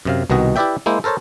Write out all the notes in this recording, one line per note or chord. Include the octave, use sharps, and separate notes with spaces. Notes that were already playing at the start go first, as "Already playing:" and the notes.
F#2 C3 F5
C2 B2 D#3 F#4 D#5
E4 G4 B4 D5 E5 G5
G#3 A#3 E4 C5
A4 A#4 C5 C#5 A5